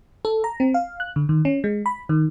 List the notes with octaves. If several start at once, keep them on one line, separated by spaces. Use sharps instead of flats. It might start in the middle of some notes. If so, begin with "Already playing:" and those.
A4
A#5
C4
F5
F#6
D3
D#3
C#4
G#3
B5
D#3